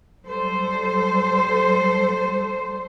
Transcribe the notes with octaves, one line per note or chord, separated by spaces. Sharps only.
F#3 G3 A4 C5